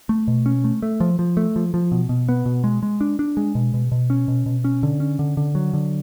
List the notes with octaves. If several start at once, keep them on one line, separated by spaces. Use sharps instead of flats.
A3
B2
C#4
A3
A3
F3
F3
A3
F3
F3
B2
B2
B3
B2
G#3
G#3
D4
D4
G#3
B2
B2
B2
C#4
B2
B2
C#4
D3
C#4
D3
D3
F#3
D3